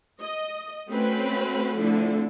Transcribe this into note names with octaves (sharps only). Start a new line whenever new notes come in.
D#5
A3 C4 C#4 F#4 B4 B5
D3 F3 A3 C4 E4